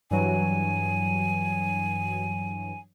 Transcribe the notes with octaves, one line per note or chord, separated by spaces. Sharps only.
G2 E3 F#3 G#5